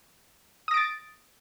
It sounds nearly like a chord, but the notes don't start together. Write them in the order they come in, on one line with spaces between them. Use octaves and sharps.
D#6 A#6 D7 A6